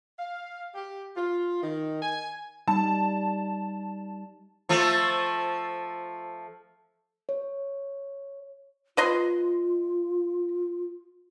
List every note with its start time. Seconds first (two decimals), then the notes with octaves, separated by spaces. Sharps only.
0.19 F5
0.75 G4
1.16 F4
1.63 D#3
2.02 G#5
2.68 G3 D#4 A5
4.69 F3 A3 F4
7.29 C#5
8.97 F4 B4 D#5 C6